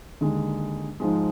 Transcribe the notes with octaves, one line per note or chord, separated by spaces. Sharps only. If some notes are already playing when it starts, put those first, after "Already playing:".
D#2 D3 G#3
G#2 F3 G#3